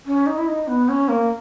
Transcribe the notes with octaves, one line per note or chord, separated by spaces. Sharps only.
C#4
D#4
E4
D#4
B3
C#4
A#3